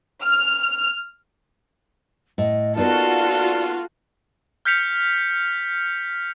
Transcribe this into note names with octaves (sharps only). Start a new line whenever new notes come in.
F6
A2 D#5
A#3 B3 D#4 F4 F#4 A4 D5
F6 G6 B6 C#7 F7